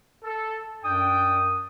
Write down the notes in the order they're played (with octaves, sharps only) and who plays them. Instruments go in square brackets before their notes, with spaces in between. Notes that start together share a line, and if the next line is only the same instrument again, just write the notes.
[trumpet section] A4
[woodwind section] F#2 D#6 [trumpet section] D4 G5